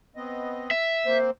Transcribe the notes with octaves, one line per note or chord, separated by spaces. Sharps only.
B3 C4 D#5
E5
A#3 C4 C5